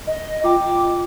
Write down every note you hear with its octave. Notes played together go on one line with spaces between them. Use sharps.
D#5
F4 G5 D6